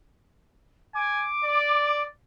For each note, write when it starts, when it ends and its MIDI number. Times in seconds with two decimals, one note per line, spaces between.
0.95 1.27 80
0.95 2.03 86
1.45 2.08 74